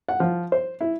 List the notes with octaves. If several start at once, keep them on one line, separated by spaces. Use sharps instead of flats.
F#5
F3
C5
E4